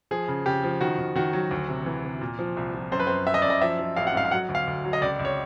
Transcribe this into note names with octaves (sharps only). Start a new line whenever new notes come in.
F3 G#4
C#3
C#3 G4
F3
D#3 F#4
D#3
D#3 F#4
F#3
D2
C3
E3
C3
A#2
F3
C2
F3
F#2 C5
B4
F#2 C5
F#2 E5
D#5
F#2 D5
D#5
F3 E5
F3
A1 F5
F#5
G#2 F5
F5
F#3 F#5
D2
F5
D2
F#3
D#5
C#2 D5
C#2
C#5